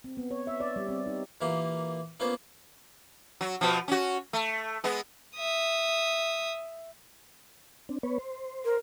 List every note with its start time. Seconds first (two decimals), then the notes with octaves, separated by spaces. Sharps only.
0.04 C4
0.17 B3
0.31 C#5
0.47 E5
0.60 D5
0.76 G3
0.89 C4
1.06 D#4
1.41 A#2 E3 A#3 G4 F5
2.20 A#3 B3 C#4 D4 F4 C5
3.41 F#3
3.61 B2 F3
3.88 C#4 F#4
4.33 A3
4.84 G#3 B3
5.37 E5 D#6
7.89 C4 D4
8.03 B3 B4 C#5
8.19 C5
8.65 A#4